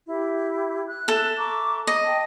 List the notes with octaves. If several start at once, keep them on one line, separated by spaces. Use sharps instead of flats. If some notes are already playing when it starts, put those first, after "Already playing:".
E4 G4
F#6
A4 E5
A#5 C#6 D6
D#5
G5 A5